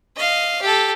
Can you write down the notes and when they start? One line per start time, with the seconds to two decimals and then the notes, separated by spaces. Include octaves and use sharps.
0.16 D#5 F5
0.62 G4 A4